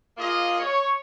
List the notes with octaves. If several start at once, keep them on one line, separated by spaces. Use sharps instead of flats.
A#3 F4 G#4 D#5
C#5